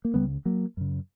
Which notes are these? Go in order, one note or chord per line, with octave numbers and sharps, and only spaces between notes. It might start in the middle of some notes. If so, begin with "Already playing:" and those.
A#3
C#2 C#3 G3 B3
F#3 A#3
F#2 C#3